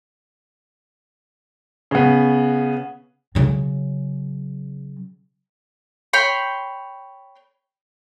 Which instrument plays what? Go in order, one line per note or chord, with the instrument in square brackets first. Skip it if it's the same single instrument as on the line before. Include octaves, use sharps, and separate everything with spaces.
[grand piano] C#3 B3
[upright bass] C#3 F#3
[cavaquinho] C#5 G5 B5 C6